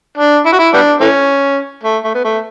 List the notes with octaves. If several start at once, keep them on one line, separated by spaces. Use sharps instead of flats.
D4
E4
F#4
E4
G3 B3 D4
E3 A3 C#4
A3
A3
B3
A3